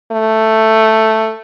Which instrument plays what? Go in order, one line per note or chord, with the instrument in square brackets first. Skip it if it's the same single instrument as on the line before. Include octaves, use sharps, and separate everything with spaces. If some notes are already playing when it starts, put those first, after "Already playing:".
[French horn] A3